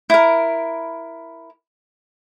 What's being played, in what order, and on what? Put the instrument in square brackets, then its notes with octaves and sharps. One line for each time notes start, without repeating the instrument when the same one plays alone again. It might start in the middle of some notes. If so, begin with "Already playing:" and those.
[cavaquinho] E4 A#4